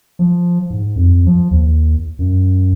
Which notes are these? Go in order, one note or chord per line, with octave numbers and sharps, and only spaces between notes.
F3
G#2
F2
F3
D#2
F#2